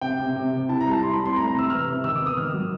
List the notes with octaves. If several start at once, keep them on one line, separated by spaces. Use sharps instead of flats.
C3 G5
C3
C3
C3
E4 A5
A#5
G3
A5
E4 C6
B5
C4
C6
A3 A#5
A#5
C3
E6
E3 F6
C3
D#3 E6
D6
B3
D#6
D#3 F6
F#3